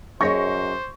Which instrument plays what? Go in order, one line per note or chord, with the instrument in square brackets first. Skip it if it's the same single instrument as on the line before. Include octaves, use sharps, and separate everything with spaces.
[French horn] F#2 [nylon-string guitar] G#4 C#5 D#5 [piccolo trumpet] C5 [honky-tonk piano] C#6 G6 A#6